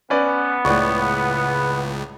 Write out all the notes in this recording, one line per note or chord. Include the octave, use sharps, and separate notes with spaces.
B3 C#4 B4 D5
C#2 A2 D5 C#6